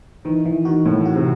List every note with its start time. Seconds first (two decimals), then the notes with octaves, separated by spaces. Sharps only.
0.25 D#3 E3
0.46 E3
0.65 D#3 F#4
0.85 A2 E3
1.05 F#4
1.15 C3